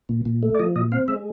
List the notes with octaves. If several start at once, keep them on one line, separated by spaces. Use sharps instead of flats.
A#2
A#2
A3
D5
F3 D#5
A#2 D#5
C4 F5
G#3 E5